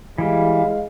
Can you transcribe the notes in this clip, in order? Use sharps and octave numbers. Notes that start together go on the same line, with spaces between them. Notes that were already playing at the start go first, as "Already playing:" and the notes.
E3 G3 G#3 F5